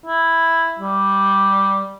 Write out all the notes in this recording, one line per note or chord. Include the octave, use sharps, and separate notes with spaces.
E4
G3